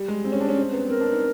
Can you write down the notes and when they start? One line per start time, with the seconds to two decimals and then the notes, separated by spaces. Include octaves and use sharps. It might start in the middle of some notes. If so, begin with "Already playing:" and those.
Already playing: G3
0.08 G#3
0.25 C4
0.32 C#4
0.41 D4
0.49 C#4
0.57 C4
0.73 B3
0.89 C4 A#4
1.00 D4
1.11 D#4